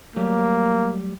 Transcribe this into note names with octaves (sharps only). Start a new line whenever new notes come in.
F#3 G3 A3 A#3